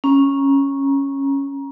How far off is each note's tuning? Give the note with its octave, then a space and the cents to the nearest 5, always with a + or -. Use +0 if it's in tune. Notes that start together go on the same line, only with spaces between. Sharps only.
C#4 -10 A#5 +25